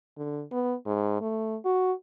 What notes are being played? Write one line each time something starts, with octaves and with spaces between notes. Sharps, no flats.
D3
B3
G#2
A3
F#4